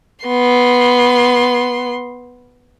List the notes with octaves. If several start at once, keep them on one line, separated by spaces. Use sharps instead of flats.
B3 C6